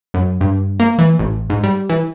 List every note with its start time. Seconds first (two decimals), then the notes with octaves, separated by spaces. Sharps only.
0.14 F#2
0.41 G2
0.80 A#3
0.99 E3
1.19 A1
1.50 G#2
1.63 G3
1.90 E3